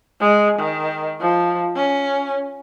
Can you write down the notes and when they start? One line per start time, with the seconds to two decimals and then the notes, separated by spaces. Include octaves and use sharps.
0.20 G#3
0.59 D#3
1.21 F3
1.76 C#4